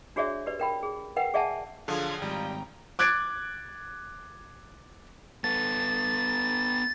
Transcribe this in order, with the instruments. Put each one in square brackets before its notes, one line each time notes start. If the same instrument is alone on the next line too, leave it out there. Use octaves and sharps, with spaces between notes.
[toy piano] D4 F#4 G#4 C#5 D5 E5
G4 B4 D5
A#4 G5 B5
G#4
A#4 B4 F#5 G5
G#4 D5 E5 F#5 G#5 A5
[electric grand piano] D3 F4 [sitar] F3 G#4 [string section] F#3 F5 G#6
[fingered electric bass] G#1 [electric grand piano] G3 [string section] G5 A#5
[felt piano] D6 F#6 G#6 A6 D7
[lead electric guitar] B3 A4 [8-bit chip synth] A6